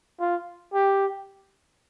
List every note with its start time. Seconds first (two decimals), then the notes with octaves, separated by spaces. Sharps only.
0.20 F4
0.74 G4